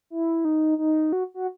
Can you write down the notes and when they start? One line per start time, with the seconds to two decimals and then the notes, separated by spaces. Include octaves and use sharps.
0.10 E4
0.45 D#4
0.78 D#4
1.13 F#4
1.34 F#4